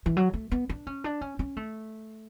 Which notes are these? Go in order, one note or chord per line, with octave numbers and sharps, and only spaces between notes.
E3
F#3
A3
B3
D4
C#4
D4
C#4
C#4
A3